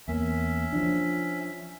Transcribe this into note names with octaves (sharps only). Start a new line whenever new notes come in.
E2 A#3 C#4 E5
F3 D4